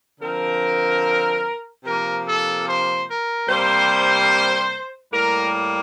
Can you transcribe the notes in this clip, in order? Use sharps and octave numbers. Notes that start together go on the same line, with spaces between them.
D3 F3 C4 A#4
C3 F3 A#3 A#4
A4
C5
A#4
C3 G3 A#3 C5
A2 G3 A#3 A#4